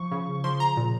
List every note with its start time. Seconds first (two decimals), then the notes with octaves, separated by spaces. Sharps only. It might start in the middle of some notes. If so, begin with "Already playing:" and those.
Already playing: F3 C#6
0.12 C#3
0.44 F3 C6
0.60 A#5
0.77 A#2